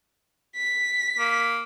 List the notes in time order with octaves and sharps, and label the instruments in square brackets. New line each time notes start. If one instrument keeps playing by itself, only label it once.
[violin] B6
[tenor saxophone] A#3